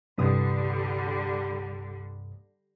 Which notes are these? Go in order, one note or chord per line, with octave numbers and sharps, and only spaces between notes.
C2 G2 D3 G3 D#6